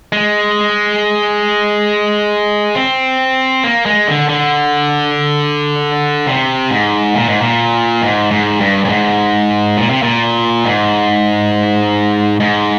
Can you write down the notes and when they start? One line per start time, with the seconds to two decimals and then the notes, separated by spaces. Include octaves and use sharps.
0.13 G#3
2.75 C4
3.64 A#3
3.86 G#3
4.08 D3
4.29 D3
6.27 C3
6.70 G#2
7.15 A#2
7.28 G#2
7.40 A#2
8.02 G#2
8.31 G#2
8.60 G2
8.85 G2
8.89 G#2
9.77 A#2
9.90 C3
10.02 A#2
10.65 G#2
12.40 G#2